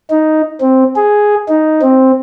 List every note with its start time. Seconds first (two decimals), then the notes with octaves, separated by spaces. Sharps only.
0.10 D#4
0.61 C4
0.96 G#4
1.48 D#4
1.82 C4